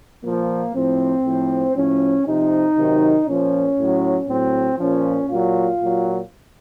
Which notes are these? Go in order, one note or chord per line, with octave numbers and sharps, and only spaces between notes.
A#2 F3 A#3
A2 F3 C4
A2 F3
A2 F3 C#4
C3 F3 D#4
C3 D#3 F#3
A#2 F3 C#4
A2 F#3
A2 F#3 C4
A#2 F3 C#4
A#2 F#3 F4
A#2 F#3